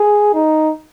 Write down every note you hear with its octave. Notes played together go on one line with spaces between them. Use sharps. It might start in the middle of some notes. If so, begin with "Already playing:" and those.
Already playing: G#4
D#4